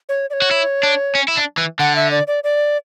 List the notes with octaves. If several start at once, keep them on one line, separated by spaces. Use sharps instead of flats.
C#5
D5
C#5
F#4
E4
D4
C#4
E4
D4
E3
D3 F#5
E5
D5
D5
D5